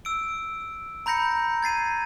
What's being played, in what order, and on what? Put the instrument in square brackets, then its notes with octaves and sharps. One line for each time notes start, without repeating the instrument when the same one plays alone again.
[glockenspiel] E6 D7
A#5 B5 G6 A#6 C#7
G#6 A6 C7 D#7